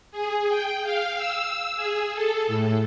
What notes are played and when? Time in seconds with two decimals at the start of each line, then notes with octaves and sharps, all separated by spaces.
0.11 G#4
0.49 G5
0.84 F5
1.17 E6
1.76 G#4
2.14 A4
2.47 A2